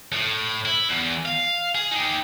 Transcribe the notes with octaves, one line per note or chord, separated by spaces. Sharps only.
A2
E4
E2
F5
G#4
D#4 G4